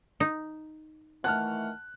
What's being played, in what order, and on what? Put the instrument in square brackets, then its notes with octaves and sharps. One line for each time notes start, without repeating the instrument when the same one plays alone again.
[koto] D#4
[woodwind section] D#3 E3 A3 [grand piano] F#5 A5 F6 [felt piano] F#6